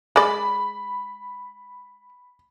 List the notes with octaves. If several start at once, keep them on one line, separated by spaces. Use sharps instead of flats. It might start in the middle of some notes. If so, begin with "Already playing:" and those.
G#3 D5 B5